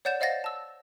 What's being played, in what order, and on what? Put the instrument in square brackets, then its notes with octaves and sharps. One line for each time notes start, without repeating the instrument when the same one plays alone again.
[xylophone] C#5 D5 F#5 G6 A6 E7
C5 D#5 F5 F#5 A6 A#6
A5 E6